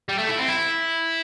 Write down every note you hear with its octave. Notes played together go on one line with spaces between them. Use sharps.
G3
A3
E4
C4
E4